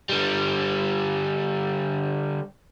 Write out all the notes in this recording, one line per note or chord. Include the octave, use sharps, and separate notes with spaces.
D3 G3